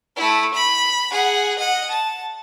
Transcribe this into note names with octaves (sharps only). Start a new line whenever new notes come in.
A3 E4
B5
G#4 F#5
D#5 F#5
A5